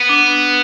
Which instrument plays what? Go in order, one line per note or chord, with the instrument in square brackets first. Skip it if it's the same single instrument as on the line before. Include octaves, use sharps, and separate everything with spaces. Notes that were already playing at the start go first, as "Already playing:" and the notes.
Already playing: [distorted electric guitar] B3
[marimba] D4